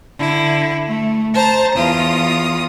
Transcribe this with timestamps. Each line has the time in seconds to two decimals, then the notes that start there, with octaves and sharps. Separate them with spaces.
0.19 D3 E4
0.88 A3
1.34 C5 A5 A#5
1.77 E2 F4 D#6